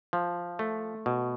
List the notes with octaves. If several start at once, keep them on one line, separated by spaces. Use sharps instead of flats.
F3
A3
B2